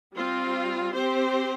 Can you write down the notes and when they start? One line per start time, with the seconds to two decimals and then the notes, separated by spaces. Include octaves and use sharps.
0.15 G3 C4 F4
0.93 C4 G4 C5